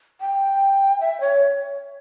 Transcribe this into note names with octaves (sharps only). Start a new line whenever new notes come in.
G5
E5
C#5